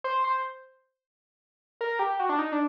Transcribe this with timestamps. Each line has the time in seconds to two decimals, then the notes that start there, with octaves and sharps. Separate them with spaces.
0.04 C5
0.24 C5
1.81 A#4
1.99 G4
2.20 F#4
2.29 D4
2.39 D#4
2.52 D4